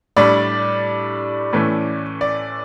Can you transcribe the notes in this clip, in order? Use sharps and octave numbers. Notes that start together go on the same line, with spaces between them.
A2 G3 D4 D5
A2 E3 A3 C#4
D5